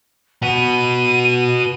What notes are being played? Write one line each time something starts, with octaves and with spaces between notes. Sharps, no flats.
F#4 B4 D#7